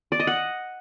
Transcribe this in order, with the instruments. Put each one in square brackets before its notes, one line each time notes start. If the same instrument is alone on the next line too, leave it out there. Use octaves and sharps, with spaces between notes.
[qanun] D5
D#5
F#5